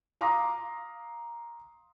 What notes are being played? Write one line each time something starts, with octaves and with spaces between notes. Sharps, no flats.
F5 A#5 C6 D6 D#6